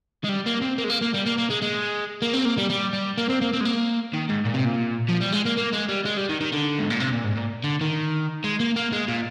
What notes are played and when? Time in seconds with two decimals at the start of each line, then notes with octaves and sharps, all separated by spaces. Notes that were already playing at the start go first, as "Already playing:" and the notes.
0.25 G#3
0.29 G3
0.46 A#3
0.62 C4
0.78 A#3
0.84 G#3
0.90 A#3
1.02 A#3
1.14 G3
1.26 A#3
1.38 A#3
1.50 G#3
1.62 G#3
2.22 A#3
2.34 C4
2.45 A#3
2.58 G3
2.70 G3
2.93 G3
3.18 A#3
3.29 C4
3.41 A#3
3.53 C4
3.61 G#3
3.65 A#3
4.13 D#3
4.29 G#2
4.45 A#2
4.54 C3
4.65 A#2
5.09 F3
5.21 G3
5.32 G#3
5.45 A#3
5.57 A#3
5.73 G#3
5.89 G3
6.05 G#3
6.17 G3
6.29 D#3
6.41 D#3
6.52 D3
6.79 G#2
6.90 A#2
7.00 C3
7.13 A#2
7.24 G#2
7.37 A#2
7.64 D3
7.81 D#3
8.44 G#3
8.60 A#3
8.76 A#3
8.92 G#3
9.08 A#2